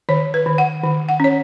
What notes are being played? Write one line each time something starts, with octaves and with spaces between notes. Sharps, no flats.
D#3 C#5
B4
D#3
F#5
D#3
F#5
C#4 C#5